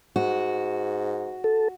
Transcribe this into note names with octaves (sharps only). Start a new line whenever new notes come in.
G#2 F#4
A4